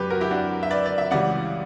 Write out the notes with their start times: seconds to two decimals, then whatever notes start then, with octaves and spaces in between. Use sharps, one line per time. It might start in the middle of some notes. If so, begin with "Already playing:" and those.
Already playing: F#2 D3 F#3 G4 B4
0.10 F#4 A#4
0.21 E4 G4
0.31 D4 F#4
0.63 E5
0.71 B4 D5
0.86 D5
0.98 E5
1.11 C#2 C#3 E3 G3 D5 F#5